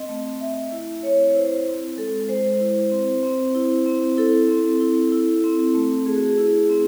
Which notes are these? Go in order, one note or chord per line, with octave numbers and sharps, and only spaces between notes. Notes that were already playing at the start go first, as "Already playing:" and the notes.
Already playing: C4 D#5
A3
A3 E5
E4
C4 C#5
E4 C5
C4
G#3 A4
G#3 C5
E4
C4
C4
E4
C4
E4 A4
C4
E4
E4
C4
A3
A3 G#4
F#4
G#4
E4
C4